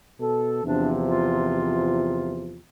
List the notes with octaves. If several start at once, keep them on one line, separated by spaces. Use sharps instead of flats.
B2 A4
E2 C3 F3 D4
F4